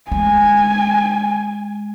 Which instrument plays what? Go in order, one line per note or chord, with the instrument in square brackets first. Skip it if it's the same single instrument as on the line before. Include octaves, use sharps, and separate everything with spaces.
[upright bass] G#3 [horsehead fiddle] G#5